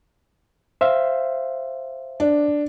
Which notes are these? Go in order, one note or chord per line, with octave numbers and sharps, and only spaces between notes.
C5 E5 F5
D4